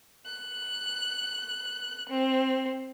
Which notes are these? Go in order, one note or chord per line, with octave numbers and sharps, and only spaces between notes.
F#6
C4